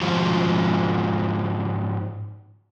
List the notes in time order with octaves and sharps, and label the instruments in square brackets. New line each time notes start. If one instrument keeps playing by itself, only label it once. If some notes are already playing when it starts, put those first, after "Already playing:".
[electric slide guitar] G#2 F3 F4 F#4